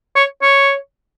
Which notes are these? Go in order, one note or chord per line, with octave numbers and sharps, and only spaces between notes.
C#5
C#5